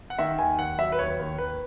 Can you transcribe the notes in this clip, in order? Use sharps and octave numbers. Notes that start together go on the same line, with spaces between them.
F#5
D#3 E5
D#2 G#5
D#2 F#5
F#3 E5
B4
D#2 C#5
D#2
D#2 B4